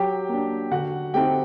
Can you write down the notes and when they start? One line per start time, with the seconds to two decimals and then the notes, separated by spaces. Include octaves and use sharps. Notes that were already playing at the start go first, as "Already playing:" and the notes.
Already playing: F#3 G4 G5
0.29 A#3 D4
0.72 D3 F#4 F#5
1.14 A3 C4 D#4 G4 G5